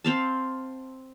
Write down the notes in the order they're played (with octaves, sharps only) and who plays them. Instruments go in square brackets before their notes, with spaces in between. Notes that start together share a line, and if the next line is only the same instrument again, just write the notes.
[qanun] C4 F5 A5